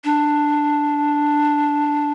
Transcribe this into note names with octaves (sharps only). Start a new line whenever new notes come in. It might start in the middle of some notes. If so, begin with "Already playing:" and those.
D4